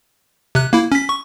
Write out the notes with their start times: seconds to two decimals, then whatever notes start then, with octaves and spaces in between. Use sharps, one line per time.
0.55 C3 F#6
0.73 A#3 E4
0.92 C#4 B6
1.09 C#6